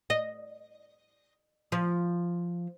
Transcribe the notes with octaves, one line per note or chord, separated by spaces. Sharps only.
D#5
F3